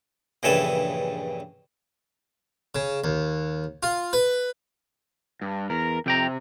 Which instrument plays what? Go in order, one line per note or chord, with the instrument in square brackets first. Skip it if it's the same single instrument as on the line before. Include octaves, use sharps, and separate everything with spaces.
[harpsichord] A#1 G2 C#3 E3 A4 G#5
C#3
D#2
F4
B4
[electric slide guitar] G2
[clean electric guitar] E2 [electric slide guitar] A#4
[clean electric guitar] F2 G5 A#5 [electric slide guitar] C3